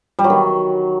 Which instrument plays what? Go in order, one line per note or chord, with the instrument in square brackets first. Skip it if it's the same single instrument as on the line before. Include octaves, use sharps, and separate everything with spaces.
[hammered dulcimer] G3
F#3
D#3